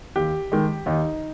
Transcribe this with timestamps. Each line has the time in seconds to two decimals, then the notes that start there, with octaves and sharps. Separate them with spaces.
0.16 D#2 G4
0.52 D#3 G#3
0.86 D#2 D#4